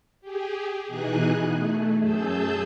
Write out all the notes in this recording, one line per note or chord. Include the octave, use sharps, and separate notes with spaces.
G4 G#4
B2 E3 D#4 G#4 G#5 F#6
A3
F#2 G#4 A5 E6 G6